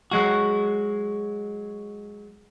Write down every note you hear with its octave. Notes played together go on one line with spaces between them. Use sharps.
F#3 G#3 F#4